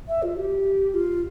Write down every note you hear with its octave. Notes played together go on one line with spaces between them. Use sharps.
E5
F4
G4
F4